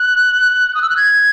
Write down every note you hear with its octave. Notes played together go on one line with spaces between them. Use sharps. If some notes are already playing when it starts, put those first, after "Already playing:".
Already playing: F#6
D#6
E6
F#6
G#6